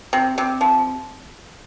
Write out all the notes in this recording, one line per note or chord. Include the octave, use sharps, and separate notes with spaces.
C3
C3
F3